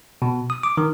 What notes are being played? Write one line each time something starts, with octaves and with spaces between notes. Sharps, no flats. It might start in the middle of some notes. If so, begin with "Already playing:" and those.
B2
D#6
D6
D#3